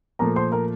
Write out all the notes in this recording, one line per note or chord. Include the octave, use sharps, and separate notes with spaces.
A#2 F3 A3 A#4 A#5
C5 C6
A#4 A#5